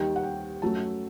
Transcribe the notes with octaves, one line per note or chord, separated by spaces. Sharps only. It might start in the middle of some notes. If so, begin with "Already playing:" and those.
Already playing: D#2 D#3 G3 G5
F#5
G5
F#2 F#3 A3 A5